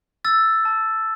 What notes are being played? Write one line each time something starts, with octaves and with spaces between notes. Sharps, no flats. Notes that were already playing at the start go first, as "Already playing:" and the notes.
E6 A6
A5